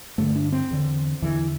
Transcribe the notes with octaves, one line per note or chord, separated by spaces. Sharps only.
G2 D3 A3
D4
C4
E2 D3
E2 D3 E3